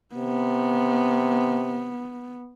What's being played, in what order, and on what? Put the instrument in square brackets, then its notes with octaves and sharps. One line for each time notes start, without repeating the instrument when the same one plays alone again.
[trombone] C3 [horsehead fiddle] B3